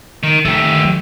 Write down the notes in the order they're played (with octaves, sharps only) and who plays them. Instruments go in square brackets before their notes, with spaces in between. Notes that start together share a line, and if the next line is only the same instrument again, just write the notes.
[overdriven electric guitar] D#3
[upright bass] D#3 [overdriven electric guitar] A3 G4
[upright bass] F#3